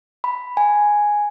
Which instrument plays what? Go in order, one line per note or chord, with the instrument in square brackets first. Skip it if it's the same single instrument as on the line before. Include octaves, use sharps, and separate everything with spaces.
[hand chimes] B5
G#5